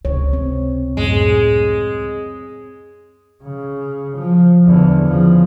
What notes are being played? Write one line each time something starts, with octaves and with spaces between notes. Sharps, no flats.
C#2 C3 C#5
C4
F#2 A2 G#3
C#3
F3
E2 D3
C#3 F3